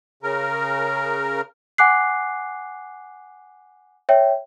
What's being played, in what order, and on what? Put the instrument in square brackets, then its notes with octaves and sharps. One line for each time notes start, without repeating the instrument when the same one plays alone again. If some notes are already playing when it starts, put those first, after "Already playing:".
[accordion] C#3 A#4
[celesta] F#5 G#5 D6 F#6 C7
C#5 E5 G5